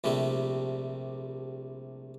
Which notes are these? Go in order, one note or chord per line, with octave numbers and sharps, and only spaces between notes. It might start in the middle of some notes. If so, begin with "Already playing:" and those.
A#1 C3 G3 A3